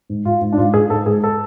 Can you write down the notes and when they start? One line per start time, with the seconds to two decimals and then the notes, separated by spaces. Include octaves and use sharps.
0.09 G#2
0.25 G#2 F4
0.42 G#2
0.53 D4
0.58 G#2 F4
0.74 G#2 G#4
0.90 G#2 A4
1.06 G#2 G#4
1.24 A4